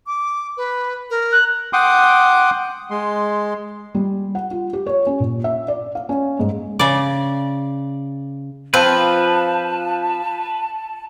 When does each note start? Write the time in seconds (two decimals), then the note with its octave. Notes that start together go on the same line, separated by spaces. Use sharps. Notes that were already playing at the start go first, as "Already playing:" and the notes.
0.07 D6
0.57 B4
1.10 A#4
1.32 F#6
1.73 F#5 G5 C6 D6 D#6
2.91 G#3 C6
3.95 G3
4.35 F#5
4.51 F4
4.73 G4
4.87 C#5
5.07 C#4
5.20 A#2
5.44 E5
5.68 D5
5.95 F5
6.09 C#4
6.39 G#2
6.79 C#3 D5
8.74 F3 C4 B4 A5